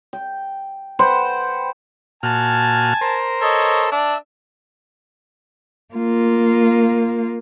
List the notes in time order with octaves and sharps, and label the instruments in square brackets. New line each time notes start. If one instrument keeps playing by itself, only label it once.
[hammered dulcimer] G5
B4 C5 F#5 G5
[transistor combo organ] A#2 F#4 F6 [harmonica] G#5 A5
[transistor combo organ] A#4 C5
[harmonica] A4 C#5 D#5
[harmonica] D4 [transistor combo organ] E5
[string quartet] A#3 F4